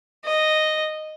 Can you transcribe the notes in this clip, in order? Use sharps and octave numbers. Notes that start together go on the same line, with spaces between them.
D#5